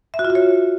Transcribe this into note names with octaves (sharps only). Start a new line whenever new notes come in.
E5
F#4
F4
F#4
C#5